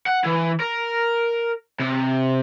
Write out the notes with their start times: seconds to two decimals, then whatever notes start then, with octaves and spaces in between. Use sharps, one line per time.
0.06 F#5
0.24 E3
0.60 A#4
1.80 C3